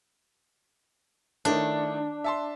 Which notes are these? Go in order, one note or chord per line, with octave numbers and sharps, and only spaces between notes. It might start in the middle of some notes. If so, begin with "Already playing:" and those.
D#3 A3 D4 E4
E5 A5 C6